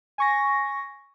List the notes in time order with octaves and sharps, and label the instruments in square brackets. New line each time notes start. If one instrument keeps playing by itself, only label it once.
[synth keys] G#5 C#6 A#6